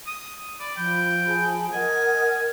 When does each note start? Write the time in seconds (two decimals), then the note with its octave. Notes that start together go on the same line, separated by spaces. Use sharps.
0.07 D#6
0.59 D5 B5
0.77 F3 G5
1.25 G#4 A5 B5
1.73 A#4 D#5 F#5 G#5